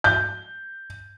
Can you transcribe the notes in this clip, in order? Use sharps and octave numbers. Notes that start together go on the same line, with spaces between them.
G6